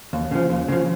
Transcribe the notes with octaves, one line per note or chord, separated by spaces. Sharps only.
D#2
C#3 F3
D#2
C#3 F3